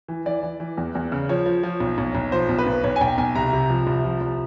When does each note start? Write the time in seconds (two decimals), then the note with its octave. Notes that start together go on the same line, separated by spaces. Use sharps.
0.08 E3
0.26 E3 D5
0.43 E3
0.60 E3
0.77 E2
0.95 E2
1.12 C#3
1.29 F3 C#5
1.46 F3
1.63 F3
1.80 B1
1.98 B1
2.15 B1
2.32 F3 C5
2.49 B1
2.58 B4
2.67 B1
2.84 B1 C#5
2.96 G#5
3.01 B1 G5
3.18 B1 G#5
3.35 C2 A#5
3.53 C3
3.70 F3
3.87 C2
4.04 F3
4.21 C2